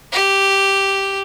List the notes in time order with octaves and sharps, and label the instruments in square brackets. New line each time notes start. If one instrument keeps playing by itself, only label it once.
[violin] G4